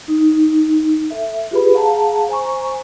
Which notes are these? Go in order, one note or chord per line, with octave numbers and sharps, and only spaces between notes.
D#4
A4 E5
F4 G4 G#4 B4 B5
G#4 F5 F#5 A5 A#5
C5 G#5 A#5 C#6